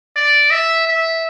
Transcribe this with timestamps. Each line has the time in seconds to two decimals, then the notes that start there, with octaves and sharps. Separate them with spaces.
0.16 D5
0.51 E5
0.88 E5